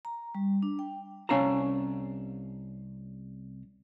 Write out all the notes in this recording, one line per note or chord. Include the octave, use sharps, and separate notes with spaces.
A#5
G3
D4
G5
C2 C#4 F5 A5 A#5